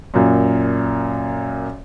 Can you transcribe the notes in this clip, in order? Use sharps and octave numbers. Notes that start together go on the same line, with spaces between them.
F#2 A#2